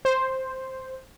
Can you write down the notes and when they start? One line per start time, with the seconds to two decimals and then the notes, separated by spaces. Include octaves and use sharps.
0.05 C5